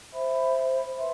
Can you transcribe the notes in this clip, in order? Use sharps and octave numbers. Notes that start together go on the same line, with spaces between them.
C5 E5 B5
B4 E5 A5 C6